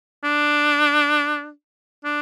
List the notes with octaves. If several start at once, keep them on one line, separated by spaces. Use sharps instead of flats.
D4
D4